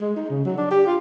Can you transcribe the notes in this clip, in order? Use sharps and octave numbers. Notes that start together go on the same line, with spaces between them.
G#3
D#4
C#3
F#3
D4
G4
F4